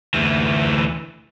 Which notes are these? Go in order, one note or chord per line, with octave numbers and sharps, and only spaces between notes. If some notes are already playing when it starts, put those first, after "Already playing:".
D2 E3